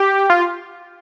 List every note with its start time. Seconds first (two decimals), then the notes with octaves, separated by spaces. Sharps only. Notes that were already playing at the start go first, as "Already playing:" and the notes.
Already playing: G4
0.30 F4